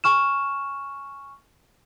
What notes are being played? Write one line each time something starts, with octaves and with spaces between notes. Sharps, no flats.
G#5 C#6 F6 E7